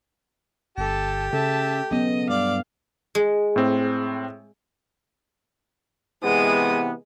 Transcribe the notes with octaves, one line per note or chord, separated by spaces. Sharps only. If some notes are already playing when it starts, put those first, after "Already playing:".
G1 G4 A4 A5
C#3 A4 E5 A5
C#3 F#3 B3 D#5
G2 D5 F5
G#3
A2 C4
C3 E3 G#3 B3 D#6